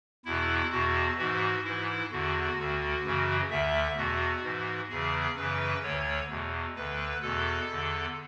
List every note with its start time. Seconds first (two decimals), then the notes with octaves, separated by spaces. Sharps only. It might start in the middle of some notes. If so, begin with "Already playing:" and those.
0.25 E2 B2 E4
0.72 E2 B2 F#4
1.18 G#2 E3 F#4
1.65 G#2 E3 E4
2.11 E2 D3 F#4
2.58 D2 D3
3.04 F#2 C#3 E3
3.51 D2 D3 E5
3.97 E2 B2 F#4
4.44 G#2 E3
4.90 E2 C#3 E3 G#4
5.37 F#2 C#3 E3 B4
5.83 D2 D3 C#5
6.29 E2 B2
6.76 D2 D3 B4
7.22 E2 B2 A4
7.69 E2 D3